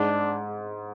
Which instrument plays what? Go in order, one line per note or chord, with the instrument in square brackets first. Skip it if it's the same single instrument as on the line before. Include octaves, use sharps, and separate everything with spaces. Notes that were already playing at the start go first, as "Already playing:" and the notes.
Already playing: [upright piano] G#2 [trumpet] D4